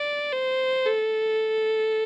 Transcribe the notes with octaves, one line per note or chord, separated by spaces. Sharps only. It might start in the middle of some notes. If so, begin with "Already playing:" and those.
Already playing: D5
C5
A4